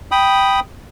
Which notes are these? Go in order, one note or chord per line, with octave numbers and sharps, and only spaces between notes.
G5 B5 D#6